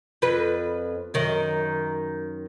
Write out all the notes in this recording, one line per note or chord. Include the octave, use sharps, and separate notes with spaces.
F2 B4
F#2 D#3